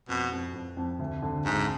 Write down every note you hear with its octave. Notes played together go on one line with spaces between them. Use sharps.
F2 B2
F2
F2
F2
D2
D3
D2 G#2